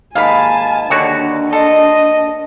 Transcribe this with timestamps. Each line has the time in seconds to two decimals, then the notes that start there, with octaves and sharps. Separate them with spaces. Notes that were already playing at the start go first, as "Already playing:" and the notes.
0.15 D#2 G#2 F5 G#5 A5 B5
0.90 D#2 D3 D4 F#4 C#5 C#6
1.53 A4 D#5 C6